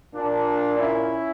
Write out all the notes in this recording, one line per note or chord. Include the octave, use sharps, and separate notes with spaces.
A#2 A#3 D4
C#4 E4